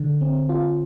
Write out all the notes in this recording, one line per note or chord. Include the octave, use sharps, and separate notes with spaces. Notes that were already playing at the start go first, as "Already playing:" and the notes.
Already playing: D3
C4
F4